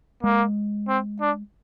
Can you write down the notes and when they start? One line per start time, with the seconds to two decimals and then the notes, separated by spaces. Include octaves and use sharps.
0.23 G#3 A#3
0.88 C4
1.21 D4